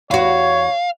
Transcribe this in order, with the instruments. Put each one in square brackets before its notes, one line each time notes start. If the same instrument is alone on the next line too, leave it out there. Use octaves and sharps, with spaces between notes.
[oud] E2 F#4 [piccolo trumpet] C#5 [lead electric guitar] F5